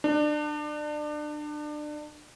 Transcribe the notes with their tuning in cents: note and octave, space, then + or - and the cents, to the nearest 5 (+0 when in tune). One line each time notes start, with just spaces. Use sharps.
D4 +30